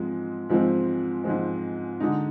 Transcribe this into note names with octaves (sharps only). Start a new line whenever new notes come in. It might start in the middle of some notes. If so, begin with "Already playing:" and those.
Already playing: G#2 F3 G#3 C4
G#2 F3 G#3 C4
G#2 F3 G#3 C4
D3 G#3 D#4